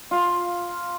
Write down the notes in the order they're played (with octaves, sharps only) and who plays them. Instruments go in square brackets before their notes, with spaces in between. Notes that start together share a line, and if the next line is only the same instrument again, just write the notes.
[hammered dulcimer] F4 F5